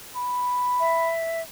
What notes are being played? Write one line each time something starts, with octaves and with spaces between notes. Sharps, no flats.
B5
E5